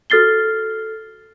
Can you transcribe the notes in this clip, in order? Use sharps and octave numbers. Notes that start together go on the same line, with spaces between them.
F#4 A4 F6 A6 C7 G7